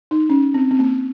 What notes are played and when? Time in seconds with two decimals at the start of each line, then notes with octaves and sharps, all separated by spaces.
0.11 D#4
0.30 C#4
0.54 C4
0.71 C4
0.79 A#3